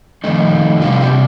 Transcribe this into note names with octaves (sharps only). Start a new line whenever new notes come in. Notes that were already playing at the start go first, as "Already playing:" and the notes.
F2 D#3 A3 D#4
C3 G3 D4 F4
F4
G4